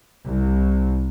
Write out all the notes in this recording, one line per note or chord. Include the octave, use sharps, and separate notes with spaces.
C2